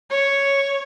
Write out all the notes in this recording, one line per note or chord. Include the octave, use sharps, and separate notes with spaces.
C#5